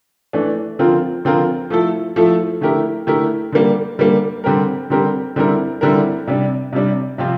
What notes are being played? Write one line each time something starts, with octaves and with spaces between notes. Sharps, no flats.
E3 A3 D4
D3 F3 C4 F4 A#4
D3 F3 C4 F4 A#4
F3 A3 E4 A4
F3 A3 E4 A4
D3 A3 E4 G4 A#4
D3 A3 E4 G4 A#4
D3 G3 A#3
D3 G3 A#3
D3 G3 C4 G4 A#4
D3 G3 C4 G4 A#4
D3 G3 C4 E4 A#4
D3 G3 C4 E4 A#4
C3 G3 D4
C3 G3 D4
C3 F3 C4 F4